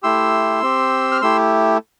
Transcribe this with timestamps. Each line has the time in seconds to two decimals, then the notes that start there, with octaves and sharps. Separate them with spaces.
0.03 A3 E4 G4 C6 E6
0.62 C4 G4
1.12 F6
1.21 A3 E4 G4 C6 E6